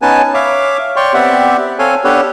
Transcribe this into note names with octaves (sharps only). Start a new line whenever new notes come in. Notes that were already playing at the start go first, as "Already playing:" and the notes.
B3 C#4 D#4 B4 G#5 A5
C#5 E5 F5 D6
C#5 D5 G5 C6 C#6
B3 C4 G4 D5 E5 F#5
C4 A4 C#5 F5 G#5
B3 D4 G4 A4 B4 C#5